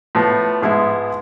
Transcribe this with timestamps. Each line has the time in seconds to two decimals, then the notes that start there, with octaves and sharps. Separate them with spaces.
0.15 A2 F3 B3
0.62 G#2 F3 G#3 B3 E4